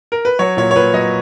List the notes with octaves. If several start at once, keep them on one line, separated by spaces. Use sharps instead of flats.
A#4
B4
F#3 C#5
A#2 C#5
C#5
A#2 B4
F#3 D#5